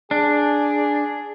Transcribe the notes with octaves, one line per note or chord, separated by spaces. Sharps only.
D4 G#4